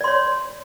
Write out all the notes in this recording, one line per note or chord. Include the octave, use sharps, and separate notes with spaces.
C#5 D5 C6